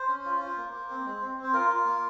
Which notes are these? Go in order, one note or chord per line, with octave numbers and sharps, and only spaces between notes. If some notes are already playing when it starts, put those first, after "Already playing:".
Already playing: C5
C#4
F4
F4
A#3
A#3
C4
G#3
C4
C4
C5
F4 A#4
F4
A#3